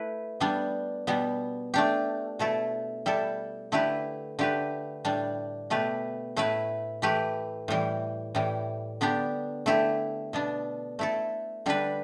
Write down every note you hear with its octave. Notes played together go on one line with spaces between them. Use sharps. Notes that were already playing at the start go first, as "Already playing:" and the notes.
Already playing: A3 E4 B4
G3 B3 D4
B2 G3 B3
A3 D4 G4
B2 A3 E4 A4
G3 E4 A4
D3 A3 E4 G4 B4
D3 A3 G4 B4
A2 G3 D4
B2 A3 G4 B4
A2 A3 E4 B4
E3 A3 G4 B4
A2 E3 G3
A2 E3 G3
D3 B3 D4 G4
D3 A3 E4 G4
B2 B3 D4
A3 E4 A4
D3 G3 D4 B4